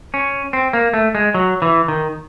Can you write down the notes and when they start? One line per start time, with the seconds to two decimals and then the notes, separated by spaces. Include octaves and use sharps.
0.14 C#4
0.53 C4
0.73 A#3
0.94 A3
1.15 G#3
1.34 F#3
1.62 E3
1.88 D#3